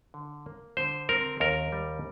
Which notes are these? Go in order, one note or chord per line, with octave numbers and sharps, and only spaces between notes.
D3
A#3
D3 C5
C4 A#4
D#2 A#4
G3